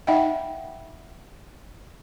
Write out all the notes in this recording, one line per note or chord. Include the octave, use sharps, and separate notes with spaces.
D#4 D#5 E5 F#5 G5